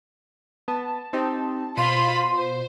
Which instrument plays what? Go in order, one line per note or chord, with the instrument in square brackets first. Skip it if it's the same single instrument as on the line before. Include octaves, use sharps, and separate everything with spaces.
[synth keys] B3 [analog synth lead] A5
[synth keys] C4 D#4 G4
[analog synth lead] B2 [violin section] F4 C5 B5 [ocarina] C6 [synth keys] D#7
[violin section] C5